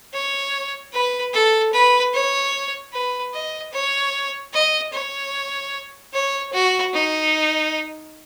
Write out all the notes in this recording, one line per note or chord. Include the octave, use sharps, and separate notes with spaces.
C#5
B4
A4
B4
C#5
B4
D#5
C#5
D#5
C#5
C#5
F#4
D#4